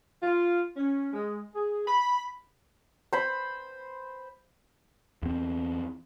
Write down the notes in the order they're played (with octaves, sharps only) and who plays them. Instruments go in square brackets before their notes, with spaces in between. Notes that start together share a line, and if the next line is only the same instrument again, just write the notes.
[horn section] F4
C#4
G#3
G#4
B5
[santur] C5 B5
[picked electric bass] E2 C4